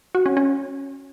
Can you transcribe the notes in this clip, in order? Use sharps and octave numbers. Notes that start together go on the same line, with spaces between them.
F#4
C#4
C#4